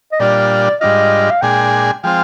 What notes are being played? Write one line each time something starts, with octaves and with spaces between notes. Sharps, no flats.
D#5
A#2 G3 D4 F4 D5
G#2 G3 D4 F4 D#5
F5
A#2 G#3 D4 G#4 G5
F3 G#3 C4 F4 G5